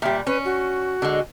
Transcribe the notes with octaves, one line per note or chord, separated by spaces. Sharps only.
A#2 G3 E5
C#4 B4
F#4
D3 G#3